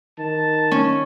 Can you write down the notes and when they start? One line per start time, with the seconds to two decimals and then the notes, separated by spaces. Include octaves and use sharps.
0.19 D#3 A5
0.71 C#4